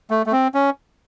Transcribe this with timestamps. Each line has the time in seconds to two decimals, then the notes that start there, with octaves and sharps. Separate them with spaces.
0.10 A3
0.26 A3
0.32 C4
0.54 C#4